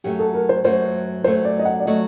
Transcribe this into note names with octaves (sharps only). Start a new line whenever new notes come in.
F#2 F#3 A3 G4
A4
A#4
C5
F#2 F#3 A3 C5
F#2 F#3 A3 C5
D5
D#5
F#5
D5
F#3 A3 D#5